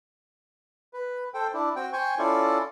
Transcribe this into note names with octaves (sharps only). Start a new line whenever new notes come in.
B4
A4 C5 G5
D4 E4
C4 F#4 G5
C5 G5 G#5 C#6
C#4 E4 F4 A4 D5